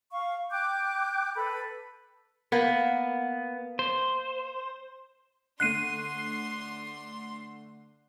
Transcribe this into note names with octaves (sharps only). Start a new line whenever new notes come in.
F5 C#6
G5 D6 F#6 G6
A4 B4 B5
A#3 B3
C5
D3 A3 D4 C6 F#6 C7 D#7